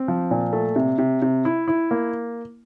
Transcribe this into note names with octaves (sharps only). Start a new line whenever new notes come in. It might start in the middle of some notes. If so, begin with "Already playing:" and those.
Already playing: C4
F3
A#2
A3
C3
C3
C3
E4
E4
A#3